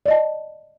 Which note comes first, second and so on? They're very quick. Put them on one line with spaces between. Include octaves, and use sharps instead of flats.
D5 D#5 A5